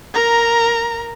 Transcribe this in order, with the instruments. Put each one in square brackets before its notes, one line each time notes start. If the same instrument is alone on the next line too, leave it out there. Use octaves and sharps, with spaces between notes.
[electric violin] A#4 A#5